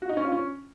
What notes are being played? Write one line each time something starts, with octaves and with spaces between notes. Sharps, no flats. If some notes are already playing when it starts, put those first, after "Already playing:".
F#4
D#4
C#4
F4
C#4